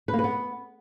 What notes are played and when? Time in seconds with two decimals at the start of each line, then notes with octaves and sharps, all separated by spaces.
0.08 B4
0.13 A#3
0.19 B4
0.24 B3